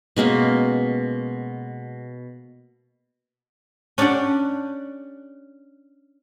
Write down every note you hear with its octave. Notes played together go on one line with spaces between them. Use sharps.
B2 G#3 A#3 C#4
C#4 D4 G4 D5 F#5